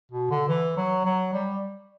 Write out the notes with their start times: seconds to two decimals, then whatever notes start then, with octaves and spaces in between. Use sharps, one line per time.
0.12 B2
0.30 D3
0.48 E3
0.77 F#3
1.05 F#3
1.33 G3